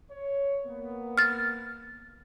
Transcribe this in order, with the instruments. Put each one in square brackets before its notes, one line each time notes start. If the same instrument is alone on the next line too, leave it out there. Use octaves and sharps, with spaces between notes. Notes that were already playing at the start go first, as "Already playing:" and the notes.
[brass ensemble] C#5
A#3 B3
[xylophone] F6 A6